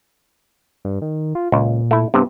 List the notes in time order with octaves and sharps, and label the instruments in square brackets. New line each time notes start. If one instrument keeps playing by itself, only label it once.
[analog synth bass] G2
D#3
F4
[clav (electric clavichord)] C#2 [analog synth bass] A#2
[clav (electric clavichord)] A3 E4
[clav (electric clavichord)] G2 C3 [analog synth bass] B3